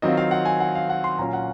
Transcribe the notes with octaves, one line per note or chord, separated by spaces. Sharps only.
D#3 F#3 C4 F4 D#5
F5
F#5
G#5
F#5
F5
F#5
C6
A#2 F#3 C#4 F4 A#5
F#5